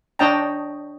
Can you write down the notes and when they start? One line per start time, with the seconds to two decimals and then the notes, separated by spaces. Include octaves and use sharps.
0.19 D4 C#5 D#5 G5 A5 A#5